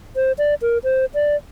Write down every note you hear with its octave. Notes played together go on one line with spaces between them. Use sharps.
C5
D5
A#4
C5
D5